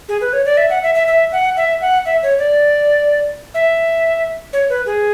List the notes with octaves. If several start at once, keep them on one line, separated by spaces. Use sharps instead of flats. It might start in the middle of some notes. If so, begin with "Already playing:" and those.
G#4
B4
C#5
D5
E5
F#5
E5
E5
E5
F#5
E5
F#5
E5
C#5
D5
E5
C#5
B4
G#4